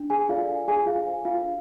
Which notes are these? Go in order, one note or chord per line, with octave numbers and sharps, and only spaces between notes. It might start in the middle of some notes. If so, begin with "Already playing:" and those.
Already playing: D4
G#4 G#5
F4 A4 D5 F5
D4 G#4 G#5
F4 F5
A4 C5
F4 F5
D4